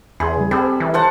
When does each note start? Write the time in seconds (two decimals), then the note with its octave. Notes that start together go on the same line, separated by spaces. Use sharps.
0.20 E2 G#4 B5 C6
0.37 C#3 G3
0.51 G3 C4 A4
0.80 E3
0.94 C5 F#5 A5